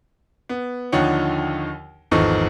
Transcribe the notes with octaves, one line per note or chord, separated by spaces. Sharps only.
B3
D#2 D3 F3 D#4 C#5 F#5
G#1 E2 F3 D#4 A4 C#6